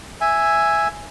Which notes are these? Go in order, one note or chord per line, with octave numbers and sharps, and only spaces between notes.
E5 G#5